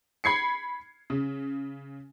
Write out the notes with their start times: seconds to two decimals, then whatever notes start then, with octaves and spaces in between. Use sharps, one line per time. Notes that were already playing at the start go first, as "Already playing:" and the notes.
0.24 B5 G#6 C7 C#7
1.10 C#3